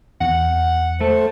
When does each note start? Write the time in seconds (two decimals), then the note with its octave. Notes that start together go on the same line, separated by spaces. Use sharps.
0.21 E2 F#5
1.01 A3 A4 C5